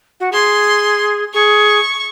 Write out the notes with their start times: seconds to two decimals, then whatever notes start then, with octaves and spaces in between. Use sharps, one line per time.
0.20 F#4
0.32 G#4 C6
1.34 G#4 C#6